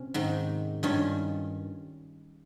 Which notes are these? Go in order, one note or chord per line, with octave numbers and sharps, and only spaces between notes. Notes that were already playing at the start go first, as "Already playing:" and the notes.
Already playing: C3 C#4
G#2 D#3
G2 D#3 C#4 F4